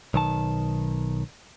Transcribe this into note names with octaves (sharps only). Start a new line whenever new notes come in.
B1 D#3 A5